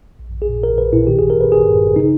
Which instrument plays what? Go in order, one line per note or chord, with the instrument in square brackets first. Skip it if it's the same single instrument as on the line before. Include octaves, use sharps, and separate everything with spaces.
[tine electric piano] A#1
A#1
G#4
A#2
A#1 A#4
A#1 B4
A#2 E4
D#3 G4
G#1 G#4
A#4
G#1 B4
G#1 G#4
G2
G#1
C#3 D#4